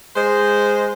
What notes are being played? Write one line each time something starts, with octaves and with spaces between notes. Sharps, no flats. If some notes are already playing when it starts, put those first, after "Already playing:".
G#3 C5